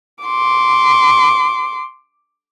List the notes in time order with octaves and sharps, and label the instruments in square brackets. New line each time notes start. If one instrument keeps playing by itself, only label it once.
[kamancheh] C6 D6